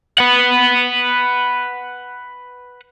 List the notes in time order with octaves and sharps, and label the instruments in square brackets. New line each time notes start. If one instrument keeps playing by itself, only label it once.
[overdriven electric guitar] B4 F#5